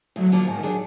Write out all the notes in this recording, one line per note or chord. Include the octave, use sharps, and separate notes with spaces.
D2 F#3
D3 F3 A#3
G#2 D#3
F#3 D4 G#4